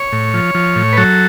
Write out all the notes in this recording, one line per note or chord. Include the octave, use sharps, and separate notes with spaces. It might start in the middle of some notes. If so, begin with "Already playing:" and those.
Already playing: C#5
A2
F3
F3
A2
B4
F#3 A4